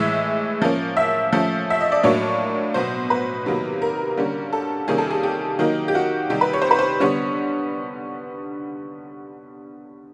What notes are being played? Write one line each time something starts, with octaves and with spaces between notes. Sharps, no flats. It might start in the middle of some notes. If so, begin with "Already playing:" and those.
Already playing: A2 E3 G#3 E5
F3 A#3 C#4
E5
F3 A3 C#4
E5
D#5
D5
A2 F#3 A#3 D4 C#5
B2 F#3 B3 C5
B4
C3 D#3 F#3 A#3
A#4
D3 G3 A#3 C#4
A4
C3 D#3 G3 A#3 C#4 G#4
A4
G#4
G4
D#3 F#3 A#3 D#4
G4
F#4
C3 D#3 G3 G4
B4
C#5
C5
B4
C5
D3 G3 B3 C#5